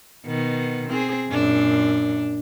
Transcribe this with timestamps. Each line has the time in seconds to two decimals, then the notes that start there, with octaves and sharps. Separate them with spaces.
0.26 B2 D#3 B3
0.89 C4 G#4
1.29 F#2 A#2 D4